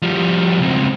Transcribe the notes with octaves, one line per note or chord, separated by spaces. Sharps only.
F3 G3
C#2 C4